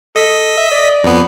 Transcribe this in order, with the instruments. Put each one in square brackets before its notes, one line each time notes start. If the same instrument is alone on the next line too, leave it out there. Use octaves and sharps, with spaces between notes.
[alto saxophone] A4 [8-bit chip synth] D#5 B6
[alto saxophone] E5
D5
[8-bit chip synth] F2 B3